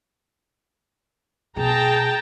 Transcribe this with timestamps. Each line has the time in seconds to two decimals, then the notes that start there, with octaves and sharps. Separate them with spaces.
1.56 B2 G#4 G5 A5 A#5